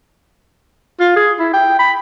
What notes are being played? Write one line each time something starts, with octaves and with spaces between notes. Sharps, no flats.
F4
G#4
E4
G5
B5